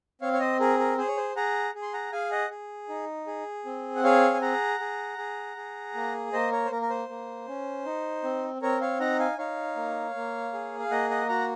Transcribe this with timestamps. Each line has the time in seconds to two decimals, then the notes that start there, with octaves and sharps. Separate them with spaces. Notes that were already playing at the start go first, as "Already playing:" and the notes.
0.21 C4 C#5 F5
0.33 C#5
0.40 C5 D#5
0.60 G#4 A#4
0.79 A#4
0.98 G#4 C5
1.07 C#5
1.17 C5
1.36 G#4 F#5 A#5
1.75 G#4
1.82 C6
1.93 F#5 A#5
2.12 G#4 F5 G#5
2.31 D#5 F#5
2.50 G#4
2.89 D#4
3.27 G#4
3.65 C4
3.95 F#5
4.03 G#4 C#5 F5
4.34 G#5
4.41 G#4 F#5 A#5
4.80 G#4
5.18 G#4
5.57 G#4
5.94 A#3
6.32 A#3 C5 D#5
6.51 A#4 C#5
6.65 C5
6.71 A#3 A#4
6.82 A#4
6.90 C5
7.09 A#3
7.47 C#4
7.85 D#4
8.23 C4
8.62 C4 A#4 C#5
8.81 C#5 F5
9.00 D#4 F#5 A#5
9.19 F5 G#5
9.38 D#4 C#5 F5
9.76 A#3
10.15 A#3
10.53 G#4
10.80 F5
10.91 A#3 D#5 F#5
11.10 D#5 F#5
11.29 F#4 F#5 A#5